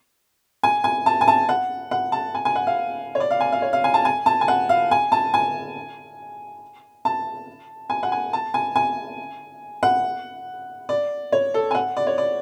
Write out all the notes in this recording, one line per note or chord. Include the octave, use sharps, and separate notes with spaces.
G#5
G#5
A5
G#5
A5
F#5
F#5
A5
G#5
G#5
F#5
F5
C#5
D5
F5
G#5
F5
C#5
F5
G#5
A5
G#5
A5
G#5
F#5
F5
G#5
A5
G#5
A5
G#5
F#5
G#5
A5
G#5
G#5
F#5
D5
C#5
A4
G#5
F#5
D5
C#5
D5